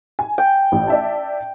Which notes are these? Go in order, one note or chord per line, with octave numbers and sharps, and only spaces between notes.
G#5
G5
A1
D5 E5 A5